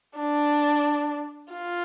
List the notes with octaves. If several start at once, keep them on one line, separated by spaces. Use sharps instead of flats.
D4
F4